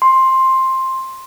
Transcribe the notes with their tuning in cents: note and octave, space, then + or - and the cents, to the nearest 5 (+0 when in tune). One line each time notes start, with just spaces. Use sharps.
C6 +10